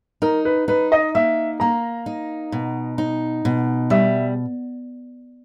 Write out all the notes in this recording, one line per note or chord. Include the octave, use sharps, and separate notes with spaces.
D#4 A#4
B4
D#4 B4
D#5
A#3 E5
A#3 A#5
D#4
B2
D#4
B2
G3 E5